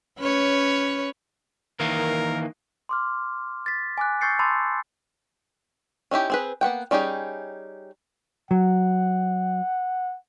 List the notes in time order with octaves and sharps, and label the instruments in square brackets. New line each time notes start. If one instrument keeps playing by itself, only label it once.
[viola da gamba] C#4 B4 C#5
[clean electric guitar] D#3 E3 A#3 [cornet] A#4
[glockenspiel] C6 D6 F6
A6 B6
G#5 D6 F#6
C#6 E6 G6 A6 C7 C#7
A5 B5 C6 D6 E6 A6
[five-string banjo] C#4 D#4 E4 G4
C4 G#4 B4
A#3 B3 F#5 G5
G3 C#4 D#4 G4 G#4
[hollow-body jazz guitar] F#3 [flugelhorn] F#5